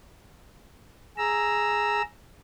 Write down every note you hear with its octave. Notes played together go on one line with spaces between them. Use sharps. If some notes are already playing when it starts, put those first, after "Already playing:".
G#4 A#5 E6